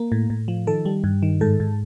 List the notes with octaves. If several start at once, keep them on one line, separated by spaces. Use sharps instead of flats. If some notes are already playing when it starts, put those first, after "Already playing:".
Already playing: A#3
A2
A2
F3
D#3 A4
G3
G2
D#3
G#2 A4
G#2